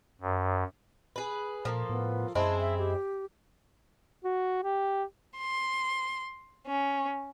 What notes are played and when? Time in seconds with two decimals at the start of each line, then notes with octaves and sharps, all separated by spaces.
0.22 F#2
1.16 G#4 B4
1.65 A#2 F3 A#3 A4
1.89 A2 B3
2.35 F#2 G#3 C4 E4 A5
2.60 E5
2.78 G4
4.24 F#4
4.63 G4
5.38 C6
6.67 C#4